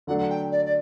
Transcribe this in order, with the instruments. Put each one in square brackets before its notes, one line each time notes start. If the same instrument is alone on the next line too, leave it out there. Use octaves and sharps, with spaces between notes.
[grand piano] D3 F#3 A3 D4 [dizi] F#5
[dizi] F#5
G5
D5
D5